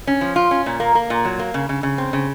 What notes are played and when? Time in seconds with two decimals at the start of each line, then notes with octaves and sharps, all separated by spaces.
0.07 C#4
0.21 F3
0.36 F4
0.51 C#4
0.66 A#2
0.80 A#3
0.95 A#3
1.10 A#2
1.25 F#3
1.39 A#3
1.54 C#3
1.69 C#3
1.83 C#3
1.98 C4
2.13 C#3